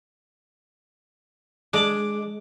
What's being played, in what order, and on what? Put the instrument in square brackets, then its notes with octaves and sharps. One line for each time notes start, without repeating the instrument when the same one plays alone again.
[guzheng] G#3 [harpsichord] D4 D5 A5